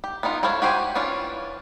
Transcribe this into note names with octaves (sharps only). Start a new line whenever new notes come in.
G4
B3 D4 D#4 F4
E4 A4 C5 C#5 F5
F#4 G4 C5 F#5 G#5
E3 C#4 D4 F4